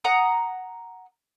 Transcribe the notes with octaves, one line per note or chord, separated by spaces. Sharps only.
F#5 A#5 D#6